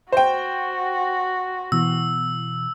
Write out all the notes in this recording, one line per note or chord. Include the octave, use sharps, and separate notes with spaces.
F#4 C5 G5
B2 E3 E6